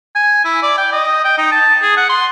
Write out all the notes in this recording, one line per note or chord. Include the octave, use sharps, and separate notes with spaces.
G#5
E4
D5
G5
D#5
G5
D#4
A5
G#4
F#5
C6